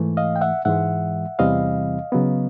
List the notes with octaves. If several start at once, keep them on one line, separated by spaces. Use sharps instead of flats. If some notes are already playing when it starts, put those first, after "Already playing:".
Already playing: G#2 E3 A3
D#5 F5
G5
E5 F#5
G#2 E3 G#3 E5 F#5
E2 C3 E3 G3 C4 D#5 F5
C#3 F#3 B3